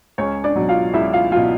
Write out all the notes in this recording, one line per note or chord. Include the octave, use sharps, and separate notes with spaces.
C#2 C#4 C#5
D4 D5
B2 F#3
F4 F5
C#2 E4 E5
F4 F5
B2 F#3 F4 F5